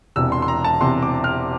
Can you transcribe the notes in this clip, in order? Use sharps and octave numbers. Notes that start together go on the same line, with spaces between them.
E1 E2 C3 E6
C6
C6
A#5
A5
E1 E2 C3 C6
D6
F6